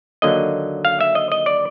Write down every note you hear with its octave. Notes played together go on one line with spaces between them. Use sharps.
D#2 D3 F#3 A#3 D#5
F5
E5
D#5
D#5
D5